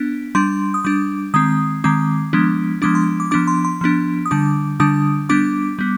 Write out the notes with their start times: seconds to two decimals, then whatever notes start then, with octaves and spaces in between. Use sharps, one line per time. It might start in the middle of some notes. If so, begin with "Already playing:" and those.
Already playing: B3 D4
0.35 G3 D4 C6
0.74 D#6
0.84 G3 D4 D6
1.34 D#3 G#3 C4 D#6
1.84 D#3 G#3 C4 D6
2.33 F3 G#3 B3 D4
2.82 F3 G#3 B3 D4 D6
2.95 C6
3.20 D6
3.31 F3 B3 D4 D6
3.47 C6
3.65 C6
3.81 F3 B3 D4
4.26 D#6
4.31 D3 G3 D4 D6
4.80 D3 G3 D4 D#6
5.29 G3 B3 D4 D6
5.79 G3 B3